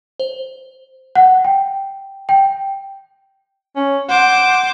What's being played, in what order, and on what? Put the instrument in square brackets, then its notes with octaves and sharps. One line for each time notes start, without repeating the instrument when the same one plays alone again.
[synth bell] C5
[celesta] F#5
G5
G5
[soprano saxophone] C#4
[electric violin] C5 D6 [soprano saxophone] F#5